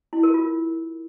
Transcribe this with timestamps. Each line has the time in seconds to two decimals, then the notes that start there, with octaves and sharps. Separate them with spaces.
0.13 E4
0.23 A#4
0.34 F4